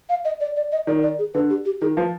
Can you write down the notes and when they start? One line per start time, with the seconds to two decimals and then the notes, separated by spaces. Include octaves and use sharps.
0.09 F5
0.25 D#5
0.40 D5
0.56 D5
0.72 D#5
0.87 D#3 D5
1.03 D5
1.19 G#4
1.34 D3 B4
1.50 G4
1.65 G4
1.81 D#3 G#4
1.97 F3 B4